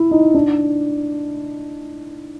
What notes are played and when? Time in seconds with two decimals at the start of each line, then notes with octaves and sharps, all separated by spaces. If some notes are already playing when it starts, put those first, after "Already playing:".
Already playing: E4
0.11 D#4
0.34 D4